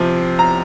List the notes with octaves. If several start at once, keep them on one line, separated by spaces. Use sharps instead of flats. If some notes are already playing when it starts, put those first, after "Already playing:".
Already playing: C3 F3 C4
A#5